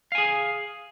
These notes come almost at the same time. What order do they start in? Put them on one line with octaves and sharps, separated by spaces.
F5 G#5 G#4